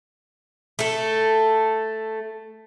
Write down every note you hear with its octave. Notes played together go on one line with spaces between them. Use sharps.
A3 A4